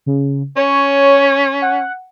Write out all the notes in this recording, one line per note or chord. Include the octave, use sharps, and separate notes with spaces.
C#3
C#4 C#5
F#5